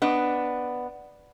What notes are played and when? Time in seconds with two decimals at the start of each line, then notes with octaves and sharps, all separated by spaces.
0.02 B3 D4 D#5